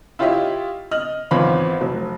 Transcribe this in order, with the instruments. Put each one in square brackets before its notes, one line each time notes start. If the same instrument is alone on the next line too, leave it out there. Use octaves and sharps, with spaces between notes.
[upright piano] E4 F4 G4 C#5 D#5 E5
D#5 F6 F#7
G#1 E2 C4 F4 C#5 B5
F1 F#3